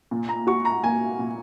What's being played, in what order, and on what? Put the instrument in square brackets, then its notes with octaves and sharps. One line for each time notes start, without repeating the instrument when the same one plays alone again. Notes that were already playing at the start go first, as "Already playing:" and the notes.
[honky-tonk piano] A#2
[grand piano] A#5
[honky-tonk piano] F#4 [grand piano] C#6
[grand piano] A#5
[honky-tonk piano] A#3 [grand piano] G#5
[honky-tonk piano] A#2